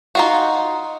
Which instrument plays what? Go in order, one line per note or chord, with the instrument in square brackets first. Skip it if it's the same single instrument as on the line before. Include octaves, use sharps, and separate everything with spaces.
[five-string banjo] D#4 F4 F#4